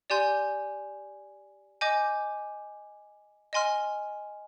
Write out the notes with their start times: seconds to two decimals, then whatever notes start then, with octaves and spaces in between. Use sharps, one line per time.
0.10 G4 D5 G#5 C6 G6
1.81 D#5 G#5 D6 G6
3.53 D#5 G#5 C6 F6